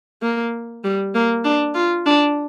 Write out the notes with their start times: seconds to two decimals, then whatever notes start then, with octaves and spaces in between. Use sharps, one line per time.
0.22 A#3
0.84 G3
1.15 A#3
1.44 D4
1.75 F4
2.06 D4